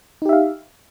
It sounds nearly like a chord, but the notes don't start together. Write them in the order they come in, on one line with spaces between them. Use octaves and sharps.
D#4 G4 E5 F5